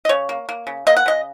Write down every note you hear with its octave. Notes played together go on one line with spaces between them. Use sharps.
D#5
C#3 C#5
A#3
A#3
C#3
A#3 D#5
F#5
C#3 D#5